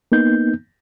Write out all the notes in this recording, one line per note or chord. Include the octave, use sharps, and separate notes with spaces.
A#3 B3 D#4 G6